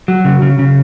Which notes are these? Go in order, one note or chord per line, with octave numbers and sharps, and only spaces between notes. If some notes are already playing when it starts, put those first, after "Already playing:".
F#3
C#3
C#3
C#3